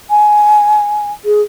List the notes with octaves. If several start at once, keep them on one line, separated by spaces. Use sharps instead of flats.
G#5
G#4